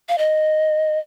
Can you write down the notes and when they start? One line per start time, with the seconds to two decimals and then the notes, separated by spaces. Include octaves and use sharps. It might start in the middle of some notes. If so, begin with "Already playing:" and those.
0.09 F5
0.18 D#5